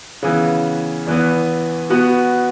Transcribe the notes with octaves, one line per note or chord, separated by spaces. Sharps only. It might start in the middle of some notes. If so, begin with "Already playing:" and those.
C#3 E3 B3
E2 E3 B3
B2 B3 F#4